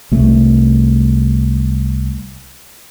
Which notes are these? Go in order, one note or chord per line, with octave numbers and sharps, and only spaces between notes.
C2 A3